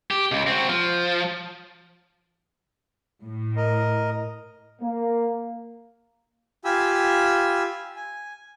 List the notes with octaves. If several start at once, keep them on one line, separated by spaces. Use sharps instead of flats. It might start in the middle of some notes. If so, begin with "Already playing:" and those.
G4
C#2
C4 F#4
F3
A2
A#4 D#5
A#3
F4 G4 G#5 B5 E6
G#5